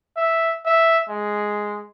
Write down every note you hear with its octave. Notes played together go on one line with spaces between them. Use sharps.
E5
E5
G#3